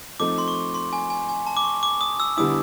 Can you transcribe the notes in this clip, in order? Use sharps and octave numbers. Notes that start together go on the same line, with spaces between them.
F3 A3 C4 D#4 D6
C6
C#6
C6
G#5
G#5
G#5
A5
D6
C#6
D6
D#6
E6
D3 G3 B3 E4 D#6